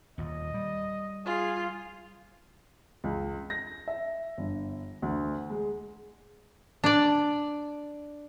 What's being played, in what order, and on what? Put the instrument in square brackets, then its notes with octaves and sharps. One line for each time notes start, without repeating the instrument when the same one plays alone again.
[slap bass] D#2 A#2 [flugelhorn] D#5
[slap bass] G3
[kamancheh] F4 [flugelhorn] G#4
[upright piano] C#2
A#6
E5
G1
D2
G#3
[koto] D4 D5